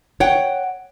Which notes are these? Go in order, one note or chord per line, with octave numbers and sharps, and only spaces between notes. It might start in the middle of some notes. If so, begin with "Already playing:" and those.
C#5 F#5 G5